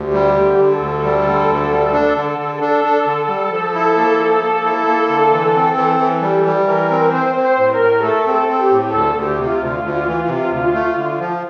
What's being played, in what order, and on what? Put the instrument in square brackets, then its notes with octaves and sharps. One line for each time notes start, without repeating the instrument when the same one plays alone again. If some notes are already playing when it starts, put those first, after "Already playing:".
Already playing: [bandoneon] D2 [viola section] G4
[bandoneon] G3
D3
D3
[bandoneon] D2 [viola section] A4
[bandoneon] G3
D3
D2
G3
D4
D3
D3
[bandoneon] D4 [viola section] A4
[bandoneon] D4
D3
G3
F3
E4
A#3
F3
A#3
E4
A#3
D3
E3
C4
E3
E3
[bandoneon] G3 [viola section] G4
[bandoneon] G3
[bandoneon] E3 [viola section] A#4
[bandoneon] C4
[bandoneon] C4 [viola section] C5
[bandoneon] C4
[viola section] C5
[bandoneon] A2
[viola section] A#4
[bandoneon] A2
[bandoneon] A3 [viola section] A4
[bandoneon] C4
[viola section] A4
[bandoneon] C4
[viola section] G4
[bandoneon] A2
[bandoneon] D2 [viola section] A4
[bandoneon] D2
[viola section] G4
[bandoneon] C3
[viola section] F4
[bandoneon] D2
D2
E3
C3
D2
A3
D3
F3